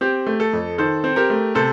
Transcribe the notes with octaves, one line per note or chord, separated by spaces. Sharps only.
C4 G4
A3
A4
F2
D#3 A4 C5
C4
G4 A#4
A3
C3 A4 C5